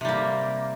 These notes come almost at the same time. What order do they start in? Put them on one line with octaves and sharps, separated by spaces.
C3 G3 A#3